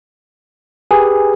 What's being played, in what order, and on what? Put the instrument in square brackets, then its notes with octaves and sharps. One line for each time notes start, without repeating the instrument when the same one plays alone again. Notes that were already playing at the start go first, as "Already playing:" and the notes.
[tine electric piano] G4 G#4 B4 [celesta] G#5